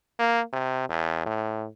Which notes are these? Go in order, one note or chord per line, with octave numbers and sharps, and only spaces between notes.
A#3
C3
E2
A2